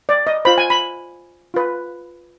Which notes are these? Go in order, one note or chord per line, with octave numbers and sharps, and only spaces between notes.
D5
D#5
F4 C5 B5
G#5
B5
F4 B4